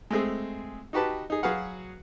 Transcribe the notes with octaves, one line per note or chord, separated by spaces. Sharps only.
G#3 A3 C4 G#4
D#4 F#4 G4 B4 A5
D#4 G#4
F#3 F#4 G#4 B4 F5 F#5